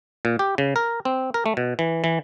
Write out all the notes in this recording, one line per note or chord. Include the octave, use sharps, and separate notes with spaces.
A#2
G4
C#3
A#4
C4
A#4
A3
B2
E3
E3